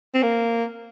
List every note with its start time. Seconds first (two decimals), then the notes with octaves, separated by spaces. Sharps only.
0.14 C4
0.23 A#3